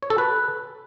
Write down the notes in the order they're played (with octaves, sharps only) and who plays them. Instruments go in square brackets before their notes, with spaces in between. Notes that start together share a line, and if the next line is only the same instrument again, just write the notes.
[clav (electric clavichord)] C#5
A4
B4